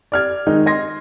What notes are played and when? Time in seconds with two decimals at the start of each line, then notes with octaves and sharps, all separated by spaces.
0.12 D5 F6 G#6
0.47 D#3 G#3 D#4
0.66 D#5 C6 G#6 A#6